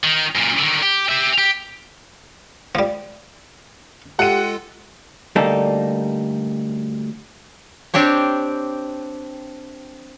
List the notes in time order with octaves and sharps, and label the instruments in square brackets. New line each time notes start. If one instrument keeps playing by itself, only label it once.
[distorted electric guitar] D#3
F#2 A#2
D3 D#3
G4
G4 E5
G4
[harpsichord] F3 G3
[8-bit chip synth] G#3 F4 A4 [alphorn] G4 [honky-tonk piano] F#5 D#7
[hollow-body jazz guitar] D2 G3 A#3 D#4 A4
[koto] C4 D4 G4 C#5